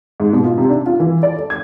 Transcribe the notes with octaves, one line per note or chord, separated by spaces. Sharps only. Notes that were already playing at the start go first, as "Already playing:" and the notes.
G#2
B2
F4
C3
D4
F4
E3
D5
A4
G#6